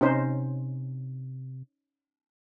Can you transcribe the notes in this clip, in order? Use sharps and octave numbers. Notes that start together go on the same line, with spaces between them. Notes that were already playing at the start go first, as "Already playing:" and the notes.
C3 C#4 D#4 C5